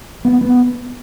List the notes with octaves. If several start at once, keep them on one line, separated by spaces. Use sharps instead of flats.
B3
B3